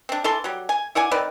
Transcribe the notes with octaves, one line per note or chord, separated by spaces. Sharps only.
C4 D4
E3 A4 A5 C6
F#3 G3
G#5
E4 D5 F#5 G#5
D#3 C4 B4 D5